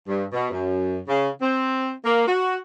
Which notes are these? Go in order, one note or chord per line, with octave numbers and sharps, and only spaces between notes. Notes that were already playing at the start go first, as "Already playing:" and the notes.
G2
B2
F#2
C#3
C4
A#3
F#4